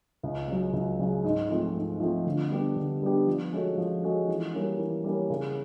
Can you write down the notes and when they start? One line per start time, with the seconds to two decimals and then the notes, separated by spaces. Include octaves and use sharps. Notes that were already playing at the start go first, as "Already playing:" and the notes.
0.23 C#2
0.48 C#3 F#3
0.73 C#2
0.99 C#3 F#3
1.24 G#2
1.50 F3 A3 C4 F4
1.75 G#2
2.00 F3 A3 C4 F4
2.26 D3
2.50 G3 B3 D4 G4
2.76 D3
3.01 G3 B3 D4 G4
3.26 F3
3.53 G#3 C#4 F#4 A4
3.77 F3
4.03 G#3 C#4 F#4 A4
4.28 E3
4.54 G3 A#3 C#4
4.78 E3
5.04 G3 A#3 C#4
5.30 C#3